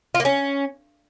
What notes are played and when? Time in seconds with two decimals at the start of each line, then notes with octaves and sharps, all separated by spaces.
0.15 F4
0.20 A#3
0.25 C#4